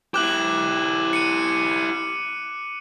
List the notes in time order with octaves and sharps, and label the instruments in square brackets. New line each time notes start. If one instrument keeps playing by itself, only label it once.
[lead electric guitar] E4 G4 [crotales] D6 F#6 F#7
[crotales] C#7 D#7